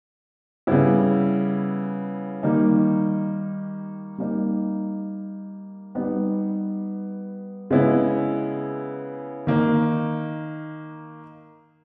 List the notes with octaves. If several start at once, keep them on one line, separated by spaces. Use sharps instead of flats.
C#3 G3 B3 E4
D#3 G3 A#3 D#4
G3 A#3 D#4
G3 B3 D#4
C#3 G#3 B3 E4
D#3 A#3 D#4